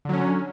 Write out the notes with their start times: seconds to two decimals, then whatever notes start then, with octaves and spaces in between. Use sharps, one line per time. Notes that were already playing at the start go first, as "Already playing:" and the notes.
0.05 D3
0.09 F#3
0.13 C#4